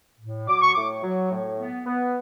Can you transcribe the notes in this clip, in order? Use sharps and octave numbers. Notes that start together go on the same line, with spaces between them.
A2
F#3 D6
C#6
A2 D6
F#3
A2
B3
B3